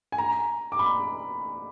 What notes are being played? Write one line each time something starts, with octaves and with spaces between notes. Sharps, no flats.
G#5
A#5
D6
B5